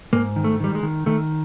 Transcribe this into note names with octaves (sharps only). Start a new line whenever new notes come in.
G#2 A#3
D#3
A3
D#3 G3
G#3
D#3
D#3 A3